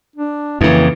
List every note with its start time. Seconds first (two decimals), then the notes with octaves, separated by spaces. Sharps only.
0.16 D4
0.61 F2 C#3 E3 A#3